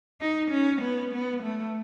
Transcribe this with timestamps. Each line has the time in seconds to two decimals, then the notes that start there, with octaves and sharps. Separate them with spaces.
0.21 D#4
0.51 C#4
0.81 B3
1.12 B3
1.42 A3